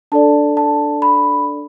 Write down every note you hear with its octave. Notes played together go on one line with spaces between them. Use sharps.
D4 A4 D5 A5
A5
B5